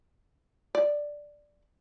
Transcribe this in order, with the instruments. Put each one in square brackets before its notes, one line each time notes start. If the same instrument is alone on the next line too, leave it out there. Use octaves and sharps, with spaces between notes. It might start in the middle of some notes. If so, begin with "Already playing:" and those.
[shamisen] D5